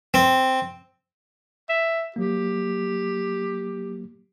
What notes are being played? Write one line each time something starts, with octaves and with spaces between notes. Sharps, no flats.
C4
E5
F#3 A#3 G4